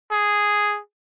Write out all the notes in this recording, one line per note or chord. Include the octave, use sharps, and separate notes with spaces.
G#4